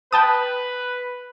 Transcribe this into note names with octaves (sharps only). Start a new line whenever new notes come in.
B4 G5 A5 D#6